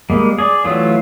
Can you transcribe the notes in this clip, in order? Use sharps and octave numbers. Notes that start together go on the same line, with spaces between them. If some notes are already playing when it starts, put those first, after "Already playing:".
G3 G#3 A#3
G#4 D5
E3 F#3 A3 F4